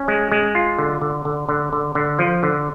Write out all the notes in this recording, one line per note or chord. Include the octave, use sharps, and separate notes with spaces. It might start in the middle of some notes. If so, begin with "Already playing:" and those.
Already playing: C#4
G#3
G#3
F4
D3
D3
D3
D3
D3
D3
F3
D3